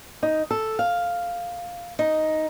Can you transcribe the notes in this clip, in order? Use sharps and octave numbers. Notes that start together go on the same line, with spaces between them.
D#4
A4
F5
D#4